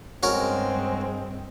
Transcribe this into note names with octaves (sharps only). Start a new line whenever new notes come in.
G2 G#3 C4 C#4 F#4 A#4